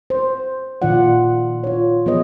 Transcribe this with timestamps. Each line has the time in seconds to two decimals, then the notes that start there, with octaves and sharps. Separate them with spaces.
0.10 C5
0.82 A#2 D#3 F3 F4 D5 F#5
1.64 F4 C#5
2.06 F3 B3 G#4 B4 C#5 D#5